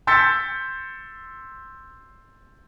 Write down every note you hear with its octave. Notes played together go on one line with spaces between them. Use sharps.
C6 E6 G6 A6 B6 C#7